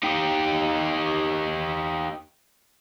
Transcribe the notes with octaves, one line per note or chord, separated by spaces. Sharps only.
D#4 G4